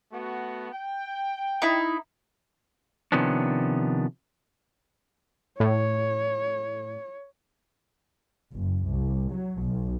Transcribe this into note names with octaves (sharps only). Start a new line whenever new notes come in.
A3 B3 F#4
G5
D#4 E4
C3 D#3 F3 B3 C#4 D4
A2 C#5
F#1
C2
F#3
B1